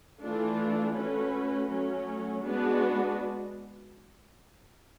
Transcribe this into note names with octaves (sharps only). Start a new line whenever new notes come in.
E3 A3 D4 F4
A3 C#4 F#4 B4
F#3 A3 C#4 F#4
G#3 B3 D4 F#4 B4